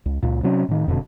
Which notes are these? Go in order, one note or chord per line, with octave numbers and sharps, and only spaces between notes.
C#2
C#2 A#2
C3 F#3 C#4
A2 D#3
E1 F2 B2 D3